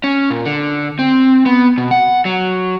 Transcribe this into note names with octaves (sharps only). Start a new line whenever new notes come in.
C#4
A#2
D3
C4
B3
B2
F#5
F#3